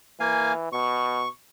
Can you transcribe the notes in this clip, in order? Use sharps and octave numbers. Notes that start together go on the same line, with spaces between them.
E3 A#3 F5 G#5
B2 C#6